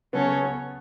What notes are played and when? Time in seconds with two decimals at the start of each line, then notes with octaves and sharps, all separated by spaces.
0.13 C#3 F#3 B3 C#4 A4 C#5
0.42 B3